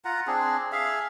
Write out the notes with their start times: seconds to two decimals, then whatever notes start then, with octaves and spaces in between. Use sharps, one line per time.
0.05 F4 F#5 A#5
0.27 C4 D4 G#4
0.72 G#4 E5 F5